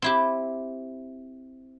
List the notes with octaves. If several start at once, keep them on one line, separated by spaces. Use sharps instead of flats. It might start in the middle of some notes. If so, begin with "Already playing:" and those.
C4 E4 G4